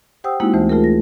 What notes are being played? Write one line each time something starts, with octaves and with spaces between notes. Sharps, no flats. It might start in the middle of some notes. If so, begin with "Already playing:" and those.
G4 C5 F#5 G5 D#6 E6
G#3 A#3 C4 D#4 E4 F#4
D2 E3 A3 C5
A3 F4 G#4 A#4
A#6